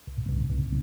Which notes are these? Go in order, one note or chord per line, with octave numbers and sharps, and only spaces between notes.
C2
C2
C2